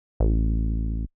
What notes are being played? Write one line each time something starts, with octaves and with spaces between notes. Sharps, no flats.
A1